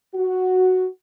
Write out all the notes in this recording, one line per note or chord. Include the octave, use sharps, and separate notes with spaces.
F#4